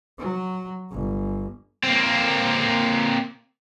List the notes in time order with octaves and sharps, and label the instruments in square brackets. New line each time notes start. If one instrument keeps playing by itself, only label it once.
[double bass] F#3
G1
[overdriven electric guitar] A#3 C4